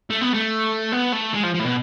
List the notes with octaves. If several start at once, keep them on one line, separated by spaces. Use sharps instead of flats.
A3
B3
A3
B3
A3
G#3
F3
F3
A2
B2